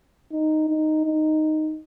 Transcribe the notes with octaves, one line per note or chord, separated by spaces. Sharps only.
D#4
D#4
D#4